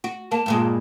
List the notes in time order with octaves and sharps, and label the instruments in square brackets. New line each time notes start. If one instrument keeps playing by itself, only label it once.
[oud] F#4
[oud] A#3 [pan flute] A5
[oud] G2 A#2 G#3